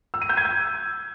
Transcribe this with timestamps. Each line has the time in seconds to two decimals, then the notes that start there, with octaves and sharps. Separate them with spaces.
0.14 E6
0.22 D#7
0.29 G6
0.37 G#6
0.45 G6